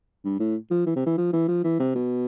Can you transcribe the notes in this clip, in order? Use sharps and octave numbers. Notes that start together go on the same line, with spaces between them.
G2
A2
F3
E3
C3
E3
F3
E3
F3
E3
C3
B2